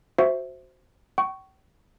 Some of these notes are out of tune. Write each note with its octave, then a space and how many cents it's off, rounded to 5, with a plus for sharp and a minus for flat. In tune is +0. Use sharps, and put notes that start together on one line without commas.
F#4 +0 C5 +0 E5 +0
G5 -40 C#6 +0